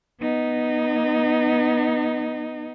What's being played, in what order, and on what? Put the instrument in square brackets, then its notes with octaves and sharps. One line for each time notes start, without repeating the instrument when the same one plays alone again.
[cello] B3 D#4